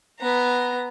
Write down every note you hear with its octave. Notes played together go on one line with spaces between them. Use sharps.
B3 A#5